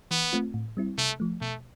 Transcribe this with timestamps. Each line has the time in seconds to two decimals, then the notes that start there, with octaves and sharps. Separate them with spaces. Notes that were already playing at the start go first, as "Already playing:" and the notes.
0.11 E3 B3
0.33 A3 C4 F4
0.54 A2
0.77 G3 C4 E4
0.98 C3 A3
1.20 F3 A3
1.41 B2 A3